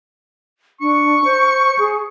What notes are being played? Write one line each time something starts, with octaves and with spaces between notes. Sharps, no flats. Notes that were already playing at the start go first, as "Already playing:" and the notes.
D4 C#6
C5
G#4